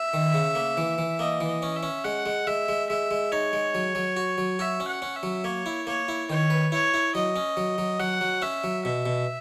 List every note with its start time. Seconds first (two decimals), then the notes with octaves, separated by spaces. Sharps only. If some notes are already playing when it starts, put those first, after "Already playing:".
Already playing: E5
0.13 D#3
0.34 C#3
0.55 A#3
0.77 E3
0.98 E3
1.19 A#3 D#5
1.41 E3
1.47 D#5
1.62 C#4
1.76 E5
1.83 C#4
2.04 G#3 F#5
2.26 G#3
2.47 G#3 E5
2.69 G#3
2.89 G#3 E5
3.11 G#3
3.31 D#4 C#5
3.53 G#3
3.75 F#3
3.95 F#3
4.17 F#4
4.38 F#3
4.59 F#4 E5
4.80 C#4
4.88 F#5
5.02 C#4
5.16 E5
5.23 F#3
5.44 A#3 C#5
5.66 E4
5.87 A#3 C#5
6.08 E4
6.30 D#3 C#5
6.50 B4
6.72 E4 C#5
6.94 E4
7.15 F#3 D#5
7.36 C#4
7.57 F#3
7.78 F#3
8.00 F#3 F#5
8.21 F#3
8.42 C#4 E5
8.64 F#3
8.85 B2 E5
9.06 B2